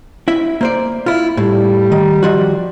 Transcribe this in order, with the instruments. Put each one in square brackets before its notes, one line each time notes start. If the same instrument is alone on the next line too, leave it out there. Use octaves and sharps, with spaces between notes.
[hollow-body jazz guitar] E4 E5
A#3 C5 D5
E4 F4
[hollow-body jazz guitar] A2 [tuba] G3
[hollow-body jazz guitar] D#3
D#3 F3 F#4